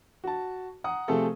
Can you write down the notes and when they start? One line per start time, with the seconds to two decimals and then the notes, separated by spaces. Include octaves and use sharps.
0.24 F#4 A5
0.84 F#5 A#5 D#6
1.08 C3 F3 A3 C4 G#4 A4